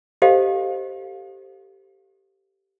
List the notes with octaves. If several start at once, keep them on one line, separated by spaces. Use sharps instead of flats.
G4 A4 C5 D#5 F5